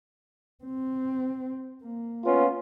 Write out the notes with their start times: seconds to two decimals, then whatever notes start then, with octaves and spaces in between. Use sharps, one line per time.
0.64 C4
1.83 A#3
2.25 B3 C#4 F4